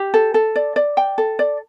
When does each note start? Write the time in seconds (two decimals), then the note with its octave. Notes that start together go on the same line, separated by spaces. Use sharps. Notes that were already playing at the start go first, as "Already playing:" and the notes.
Already playing: G4
0.14 A4
0.34 A4
0.56 D5
0.76 D5
0.97 G5
1.18 A4
1.39 D5